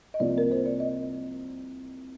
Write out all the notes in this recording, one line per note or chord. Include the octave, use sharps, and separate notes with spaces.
D#5
C2 C3 F3 A#3 F4 D5
A#4
C5
D5
D#5